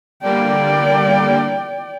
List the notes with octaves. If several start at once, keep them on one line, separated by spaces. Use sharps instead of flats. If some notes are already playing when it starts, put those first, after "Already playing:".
D3 G3 A#3 D5 G5